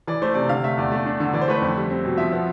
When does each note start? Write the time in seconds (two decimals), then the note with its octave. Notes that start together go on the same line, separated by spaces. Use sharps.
0.07 E3 D5
0.22 A3 C5
0.34 C3 D5
0.49 D3 F5
0.64 A3 E5
0.77 E2 D5
0.91 A3 D5
1.05 D4
1.20 D3
1.33 E3 D5
1.41 C5
1.48 A3 B4
1.57 F2 C5
1.77 G3
1.91 C4
2.05 B2
2.18 F3 E5
2.32 B3